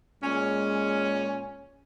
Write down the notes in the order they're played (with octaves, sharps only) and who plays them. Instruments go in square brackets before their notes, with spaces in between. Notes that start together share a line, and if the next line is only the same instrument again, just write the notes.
[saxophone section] A#2 C#4 [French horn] G#3